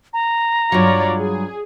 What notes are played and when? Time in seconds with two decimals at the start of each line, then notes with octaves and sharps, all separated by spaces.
0.13 A#5
0.72 G2 F#3 F4 C#5 D5
1.17 G#4